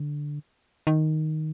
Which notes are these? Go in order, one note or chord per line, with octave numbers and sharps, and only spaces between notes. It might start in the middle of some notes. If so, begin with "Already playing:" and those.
Already playing: D3
D#3